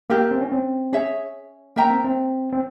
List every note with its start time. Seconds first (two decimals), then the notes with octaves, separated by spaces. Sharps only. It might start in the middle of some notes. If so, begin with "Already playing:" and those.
0.10 A#3 E4 G4 A#4
0.31 C4
0.41 C#4
0.52 C4
0.93 C#4 G#4 C#5 E5
1.76 A#3 A#4 E5 G5 A#5
1.90 C4
2.04 C4
2.53 C4